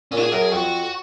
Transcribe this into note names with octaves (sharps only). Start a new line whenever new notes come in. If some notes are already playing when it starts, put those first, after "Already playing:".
A#2 C#4
G#4
F#2 A#4
G#4
F2 F#4